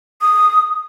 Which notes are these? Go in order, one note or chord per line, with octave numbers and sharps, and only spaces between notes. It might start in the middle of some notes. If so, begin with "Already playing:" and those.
D#6